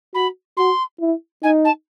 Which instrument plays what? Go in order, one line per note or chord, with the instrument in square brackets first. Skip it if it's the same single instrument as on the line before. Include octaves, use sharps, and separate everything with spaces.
[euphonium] F#4 [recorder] B5
[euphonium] F#4 [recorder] C6
[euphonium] E4
[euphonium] D#4 [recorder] G#5
[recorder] A5